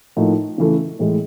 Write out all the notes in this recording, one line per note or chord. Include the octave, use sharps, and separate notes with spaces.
A2 F3 A#3 D#4
C#3 E3 A3
A2 E3 G#3